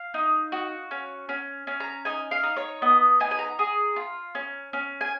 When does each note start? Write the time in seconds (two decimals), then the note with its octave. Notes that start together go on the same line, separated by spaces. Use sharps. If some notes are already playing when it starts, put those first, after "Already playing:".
Already playing: F5
0.14 D#4
0.52 F#4
0.91 C#4
1.29 C#4
1.67 C#4
1.80 A#5
2.05 D#4 G#5
2.31 F5
2.43 D#4
2.57 C#5
2.82 B3 D#5
3.20 D#4 G#5
3.31 G#5
3.39 A#5
3.59 G#4
3.96 F4
4.35 C#4
4.73 C#4
5.01 G#5